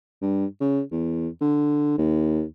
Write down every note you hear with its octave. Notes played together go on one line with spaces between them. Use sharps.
G2
C#3
E2
D3
D#2